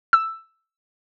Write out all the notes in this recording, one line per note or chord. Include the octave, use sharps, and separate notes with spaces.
E6